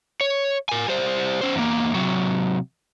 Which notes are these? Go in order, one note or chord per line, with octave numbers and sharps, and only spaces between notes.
C#5
A#4 G#5
G3 C5
C#4 C5
E2 A#3
C3 F#3